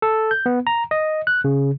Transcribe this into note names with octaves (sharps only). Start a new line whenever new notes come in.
A4
G6
B3
A#5
D#5
F#6
C#3